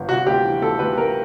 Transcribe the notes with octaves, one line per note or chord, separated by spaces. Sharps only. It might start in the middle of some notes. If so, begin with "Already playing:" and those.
Already playing: G1
C3 F#4
D2 G4
E3
D2 A4
D2 B4
D2 A#4